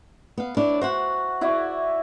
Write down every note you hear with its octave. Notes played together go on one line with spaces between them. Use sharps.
B3 F5
D4 E4 C#5
F#4 C5 E5 F#5
E4 F#4 D5